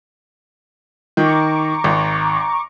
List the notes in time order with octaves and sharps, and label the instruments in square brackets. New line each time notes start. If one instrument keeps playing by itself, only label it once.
[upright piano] D#3 [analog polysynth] A#5 C#6 D6
[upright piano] G#1